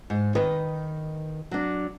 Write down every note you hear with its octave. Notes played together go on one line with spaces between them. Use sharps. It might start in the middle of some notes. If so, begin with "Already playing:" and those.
G#2
D#3 B4 D#5
F#3 D4